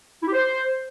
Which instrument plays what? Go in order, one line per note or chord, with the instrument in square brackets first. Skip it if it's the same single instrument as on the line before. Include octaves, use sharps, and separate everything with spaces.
[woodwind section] E4
G4
C5